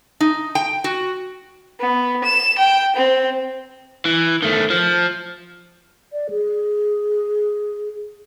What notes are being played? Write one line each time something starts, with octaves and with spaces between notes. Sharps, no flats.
D#4
G5
F#4
B3
E7
G5
C4
E3
D#3 A3
F3
D5
G#4